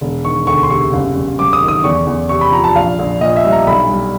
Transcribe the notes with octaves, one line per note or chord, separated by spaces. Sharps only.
E1
D#3 C#6
D2 C#6
C6
C3 C#6
F#1
F#1
F#2 D6
D#6
D#3
D#6
E2 C#6
E2
C3 C#6
B5
F3 A#5
A5
A#1 F5
A#1
A#2 D#5
E5
G3
A#5
B1 B5
G3